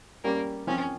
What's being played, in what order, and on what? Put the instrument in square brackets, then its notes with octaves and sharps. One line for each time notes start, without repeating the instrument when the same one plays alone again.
[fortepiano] G3 C#4 G4 [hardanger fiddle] A#3
[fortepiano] F3 C4 F4 [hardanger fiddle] C#4